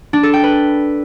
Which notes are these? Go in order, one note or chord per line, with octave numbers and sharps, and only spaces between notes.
D4
A4
G5
B4